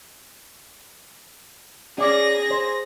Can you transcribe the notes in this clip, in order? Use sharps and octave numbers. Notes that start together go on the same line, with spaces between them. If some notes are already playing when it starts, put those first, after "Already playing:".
C#4 G#4 D5 A#6
C5